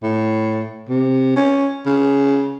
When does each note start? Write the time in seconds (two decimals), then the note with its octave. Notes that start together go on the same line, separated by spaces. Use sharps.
0.03 A2
0.89 C3
1.36 C#4
1.86 C#3